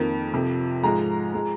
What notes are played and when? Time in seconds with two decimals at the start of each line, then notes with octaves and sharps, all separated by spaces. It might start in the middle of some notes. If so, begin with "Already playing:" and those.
Already playing: F2 D#3 A#3
0.34 F2 C3 F3
0.83 G#2 F3 G#3 A#5
1.34 F3 G#3